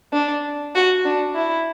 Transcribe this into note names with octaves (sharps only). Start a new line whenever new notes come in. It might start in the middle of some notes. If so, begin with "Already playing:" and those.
D4
F#4
D4
E4